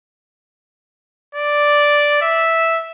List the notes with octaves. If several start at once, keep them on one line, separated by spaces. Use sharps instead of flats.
D5
E5